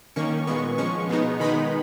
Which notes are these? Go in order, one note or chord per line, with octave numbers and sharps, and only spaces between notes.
D#3 A#3 C#4 C#6
A#2 G#3 B3 C#6
F3 G#3 C#4 C#6
B2 G#3 B3 D#4
D#3 G#3 B3 D#4 B5